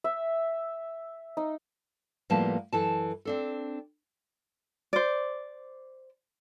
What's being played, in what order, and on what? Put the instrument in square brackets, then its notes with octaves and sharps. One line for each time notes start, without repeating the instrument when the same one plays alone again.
[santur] E5
D#4
[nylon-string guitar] A2 F3 G3 A#3 B3 A5
F#2 E3 A4 A5
C4 D4 A4
[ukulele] C5 D5